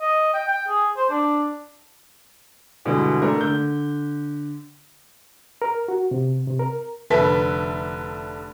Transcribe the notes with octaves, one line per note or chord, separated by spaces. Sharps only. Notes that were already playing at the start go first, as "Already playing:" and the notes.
D#5
G5
G5
G#4
C5
D4
G2 B2 D3 E3 G#3
A3 D4 A#4
D3 G6
A#4
F#4
C3
C3
A#4
F1 D3 B4 E5 A5 B6